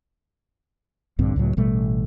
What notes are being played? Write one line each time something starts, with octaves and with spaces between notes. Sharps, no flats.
A#1 G2 D3 C4
C#2 A2 F#3
A1 B2 G3 A3